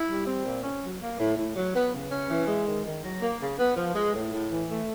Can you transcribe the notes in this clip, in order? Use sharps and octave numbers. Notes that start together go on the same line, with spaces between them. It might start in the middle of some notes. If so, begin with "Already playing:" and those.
Already playing: E4
G3
C4
A#2
C#4
F#3
A#3
A2
A2
F#3
B3
C#3
C#4
E3
G#3
D#3
D#3
F#3
A#3
C#3
B3
F3
G#3
A2
A2
E3
A3